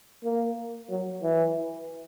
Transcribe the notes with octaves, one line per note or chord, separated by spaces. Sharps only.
A#3
F#3
E3